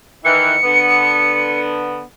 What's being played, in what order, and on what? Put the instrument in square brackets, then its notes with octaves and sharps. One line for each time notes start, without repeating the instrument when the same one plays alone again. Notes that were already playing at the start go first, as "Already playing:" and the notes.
[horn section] D#3 E3 [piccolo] C#7
[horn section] D3 B3